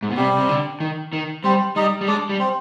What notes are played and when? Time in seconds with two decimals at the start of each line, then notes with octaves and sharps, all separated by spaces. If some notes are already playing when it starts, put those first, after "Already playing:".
0.03 G#2
0.09 B2
0.17 C3 G3 G4
0.38 C3
0.49 D3
0.80 D#3
1.13 D#3
1.44 G3 C4 C5
1.76 G3 D#4 D#5
2.01 G3
2.08 G#3 D4 D5
2.29 G3
2.40 C4 C5